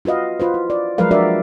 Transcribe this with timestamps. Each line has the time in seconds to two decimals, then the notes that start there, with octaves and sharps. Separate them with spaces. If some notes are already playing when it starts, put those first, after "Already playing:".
0.05 F4 F#4 B4 D#5 F5
0.40 F4 B4 C5
0.54 E4
0.70 D5
0.98 F3 F#3 G#3 A#4 B4 F5
1.11 D4 F#4 A#4 D5 E5